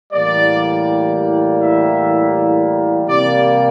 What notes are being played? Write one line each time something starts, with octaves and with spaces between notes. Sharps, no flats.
A2 E3 G3 A#3 D5
E5
C3 G3 A#3 D5